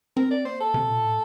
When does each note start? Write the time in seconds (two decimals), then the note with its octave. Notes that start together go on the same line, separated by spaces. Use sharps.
0.16 C4 A#4
0.31 D5
0.45 A#3 C5
0.60 A4
0.74 C3
0.89 A#2
1.04 A2